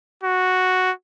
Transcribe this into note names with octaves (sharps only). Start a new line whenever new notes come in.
F#4